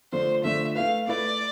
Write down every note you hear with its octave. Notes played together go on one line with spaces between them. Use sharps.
D3 F3 A3 D4 C5
D3 F3 A3 D4 E5
A3 E4 B4 F5
A3 E4 B4 D5